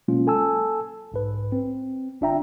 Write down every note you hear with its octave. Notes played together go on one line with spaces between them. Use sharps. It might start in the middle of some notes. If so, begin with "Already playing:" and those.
B2 F#3 G#3 A#3 C#4 F4
A4 G#5 A5 E6
B1 G#2 B4
C4
G1 D4 F4 E5 G5 A#5